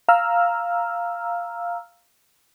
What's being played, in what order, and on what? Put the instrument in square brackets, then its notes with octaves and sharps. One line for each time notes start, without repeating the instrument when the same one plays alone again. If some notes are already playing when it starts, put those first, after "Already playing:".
[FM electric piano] F5 A#5 E6 F6